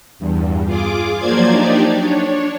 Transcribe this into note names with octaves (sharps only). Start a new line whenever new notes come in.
E2 G2
F4 G#4 D6
F3 F#3 A#3 C5 D5 G#6
D4 D#4 G4 D5
D4 C#5